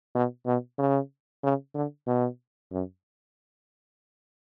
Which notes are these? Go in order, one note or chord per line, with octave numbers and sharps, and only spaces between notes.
B2
B2
C#3
C#3
D3
B2
F#2